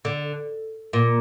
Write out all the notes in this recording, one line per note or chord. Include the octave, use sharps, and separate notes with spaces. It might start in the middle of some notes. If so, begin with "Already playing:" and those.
D3
A#2